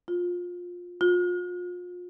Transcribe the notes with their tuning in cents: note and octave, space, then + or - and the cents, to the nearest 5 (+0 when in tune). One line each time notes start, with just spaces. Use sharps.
F4 +20
F4 +35